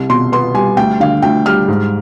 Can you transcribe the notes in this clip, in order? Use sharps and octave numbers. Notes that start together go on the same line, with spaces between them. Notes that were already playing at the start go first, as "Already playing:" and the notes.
Already playing: C2
B2 C6
B3 C6
G3 G#5
D2 G5
D3 F5
D2 G5
G3 F6
G#2